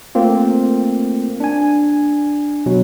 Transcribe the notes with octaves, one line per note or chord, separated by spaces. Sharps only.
A3 A#3 C4 F4
D4 G#5
B2 F#3